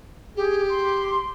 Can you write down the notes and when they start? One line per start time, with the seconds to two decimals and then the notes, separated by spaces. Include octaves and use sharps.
0.36 G4 G#4
0.69 C6